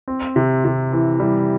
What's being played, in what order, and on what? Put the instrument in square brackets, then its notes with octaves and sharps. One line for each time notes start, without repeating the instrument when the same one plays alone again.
[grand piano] C4
C3
C3
E3
G3